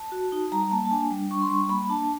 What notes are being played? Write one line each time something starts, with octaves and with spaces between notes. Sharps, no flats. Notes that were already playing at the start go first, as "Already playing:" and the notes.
Already playing: A5
F#4
D#4
G3 A#5
A#3 A5
A5
D4 G#5
G3
D4 C#6
C6
G3 C#6
A#3 B5
D4 A5